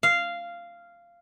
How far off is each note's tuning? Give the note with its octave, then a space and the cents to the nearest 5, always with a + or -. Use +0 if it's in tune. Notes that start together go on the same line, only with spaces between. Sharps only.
F5 -10